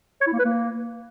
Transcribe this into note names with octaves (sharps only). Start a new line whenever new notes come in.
C#5
E4
A#3
B4
A#3